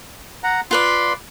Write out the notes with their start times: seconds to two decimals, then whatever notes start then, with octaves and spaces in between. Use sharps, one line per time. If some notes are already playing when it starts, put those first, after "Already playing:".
0.44 F#5 A#5
0.71 F4 B4 D5 C6